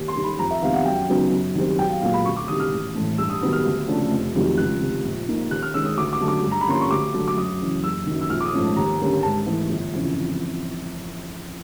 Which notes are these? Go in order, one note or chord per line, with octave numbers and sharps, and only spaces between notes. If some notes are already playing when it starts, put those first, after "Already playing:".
Already playing: D#2
C6
D#3 G3
B5
F2 A#5
E5
C3 D#3 G3 B3 F5
F#5
F#2 G5
C#3 F#3 B3 D#4
F#2
D#3 G3 C4
B1 G5
F5
A#2 F#3 A#3 F5
B5
D2 C#6
D6
C3 D#3 G3 D#6
F6
A1
A2 E3 A3
G2 E6
D#6
D#3 F#3 B3 D#4 D#6
F6
D2
C#3 F3 A3 D4
F1
F2 C3 D#3 F#3
C#2 F#6
C3 D#3
A#1
A#2 F3 A#3 D#4
D#2 F#6
F6
D#3 G#3 C#4 E6
D#6
D2 D6
D6
D3 F#3 A3
D6
G2
A#5
B5
D3 F3 A#3 C#4 C6
C#6
D2 D6
D3 F#3 A3
D6
F#2 D#6
C#3 E3
F#1 E6
F#2 D#3
E6
A#1 F6
D6
D#6
G#2 F3 A3 C#4
D#2 A#5
D3 G3 A#3 C#4
G#2 A5
E3 A3
G1
F2 C#3 E3